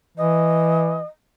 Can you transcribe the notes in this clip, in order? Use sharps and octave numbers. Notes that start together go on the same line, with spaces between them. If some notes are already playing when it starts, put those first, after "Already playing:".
E3 D#5